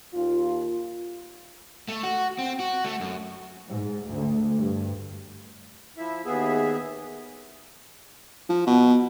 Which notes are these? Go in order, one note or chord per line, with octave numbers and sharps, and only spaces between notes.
D#2 F4
A3
F#4
C4
F#4
A3
F#2
G#2
D2
G2
F3 E4 E5
D#2 B3 G#4 E5
F3
B2